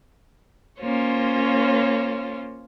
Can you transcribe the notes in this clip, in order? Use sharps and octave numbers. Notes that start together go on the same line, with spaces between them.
A#3 C#4 F4 C5 C#5